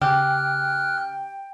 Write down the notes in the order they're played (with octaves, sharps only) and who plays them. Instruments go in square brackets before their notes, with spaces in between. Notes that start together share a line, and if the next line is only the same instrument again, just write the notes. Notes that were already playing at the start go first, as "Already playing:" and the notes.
[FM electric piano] C#3 [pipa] G4 [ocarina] G5 [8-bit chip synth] F6 F#6